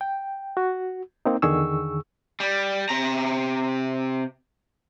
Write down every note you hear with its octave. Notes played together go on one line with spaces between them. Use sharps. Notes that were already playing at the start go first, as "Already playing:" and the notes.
G5
F#4
A#3 C4 D#4
E2 D3 D#3 G#4 C#6 E6
G3
C3 A#5